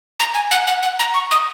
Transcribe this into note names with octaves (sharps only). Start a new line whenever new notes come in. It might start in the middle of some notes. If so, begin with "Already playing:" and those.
A#5
G#5
F#5
F#5
F#5
A#5
C#6
D#6